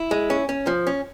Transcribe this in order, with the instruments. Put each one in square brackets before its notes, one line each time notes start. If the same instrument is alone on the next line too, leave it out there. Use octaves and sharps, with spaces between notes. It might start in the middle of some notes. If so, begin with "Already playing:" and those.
Already playing: [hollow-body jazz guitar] E4
G#3
C#4
C#4
F3
C#4